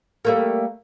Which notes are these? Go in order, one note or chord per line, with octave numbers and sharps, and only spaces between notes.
G3 A3 A#3